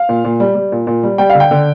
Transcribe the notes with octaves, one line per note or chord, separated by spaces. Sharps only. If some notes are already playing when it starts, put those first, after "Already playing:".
Already playing: F5
A#2
A#2
G3
G3
A#2
A#2
G3
G3 G5
F5
D3
G5
D3